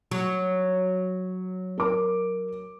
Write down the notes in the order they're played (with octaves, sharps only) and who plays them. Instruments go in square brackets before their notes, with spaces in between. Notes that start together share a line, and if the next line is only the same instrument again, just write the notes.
[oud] F#3
[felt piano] A#4 D6